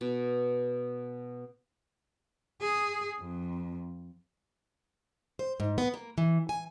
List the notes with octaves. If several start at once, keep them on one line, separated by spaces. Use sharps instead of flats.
B2
G#4
F2
C5
G#2
B3
A#3
E3
G#5